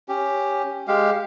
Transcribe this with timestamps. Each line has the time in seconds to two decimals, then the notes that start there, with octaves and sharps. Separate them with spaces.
0.08 C#4 G4
0.88 G#3 G4 F5